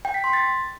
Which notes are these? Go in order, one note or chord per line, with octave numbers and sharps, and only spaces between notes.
G5
B6
C6
A6